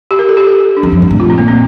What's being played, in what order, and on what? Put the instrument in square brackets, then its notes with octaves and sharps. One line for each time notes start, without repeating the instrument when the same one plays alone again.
[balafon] G4
A#4
A4
G4
A4
D4
[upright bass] E2 [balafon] C4
[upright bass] F2
G2
A2
[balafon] F4
C4
[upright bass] A#2 [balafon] A#3
[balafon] C4